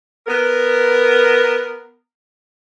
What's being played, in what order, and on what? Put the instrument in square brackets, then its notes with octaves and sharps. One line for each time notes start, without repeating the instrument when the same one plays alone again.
[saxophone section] B3 A#4